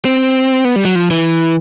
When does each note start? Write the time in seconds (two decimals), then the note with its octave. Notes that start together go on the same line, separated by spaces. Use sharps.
0.05 C4
0.65 B3
0.76 G3
0.85 F#3
0.95 F3
1.11 E3